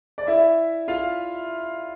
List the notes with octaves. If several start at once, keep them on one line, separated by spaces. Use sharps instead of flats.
D5
E4 E5
F4 F5